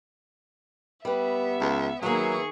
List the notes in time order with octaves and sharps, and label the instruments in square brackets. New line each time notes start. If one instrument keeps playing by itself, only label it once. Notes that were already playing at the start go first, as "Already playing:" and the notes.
[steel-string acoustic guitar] G3 B4 [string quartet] B3 E5
[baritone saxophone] C#2
[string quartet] D#3 G#4 C#6 [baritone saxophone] F#3 [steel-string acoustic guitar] A#3 B3 E5